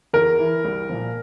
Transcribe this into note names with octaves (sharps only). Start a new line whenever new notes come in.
E2 A#4
E3
C2
A#2 F3